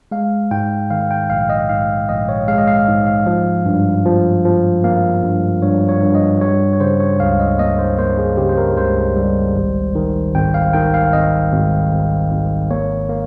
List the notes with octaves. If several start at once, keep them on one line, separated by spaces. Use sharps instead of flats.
G#3 F5
G#2 G5
D#3 F5
G5
A#1 F5
D#5
G#2 F5
A#1 D#5
C#5
G#3 F5
D#5
F5
G#2
F5
F3
G2
F3
F3
A#3 F5
G2
G2 C#5
C#5
G2
D#5
G3 C#5
C#5
C#3 C5
C#5
C#2 F5
D#5
A#3 D#5
C5
A#3 C5
G#4
C#3 G4
C5
A#4
C#2 C5
G3
G#1
D#3
G#1 G5
F5
D#3 G5
F5
G#1 D#5
G#1
G#1
G#1
A#3 C#5
A#3